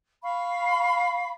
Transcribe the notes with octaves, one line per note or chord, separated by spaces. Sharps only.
F5 B5 C#6